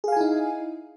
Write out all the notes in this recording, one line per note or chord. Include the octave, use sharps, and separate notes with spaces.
D#4 E4 G#4 F5 G#5